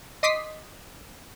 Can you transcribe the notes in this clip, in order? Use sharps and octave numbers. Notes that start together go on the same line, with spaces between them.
D#5 C6 D6 D#6 B6 C7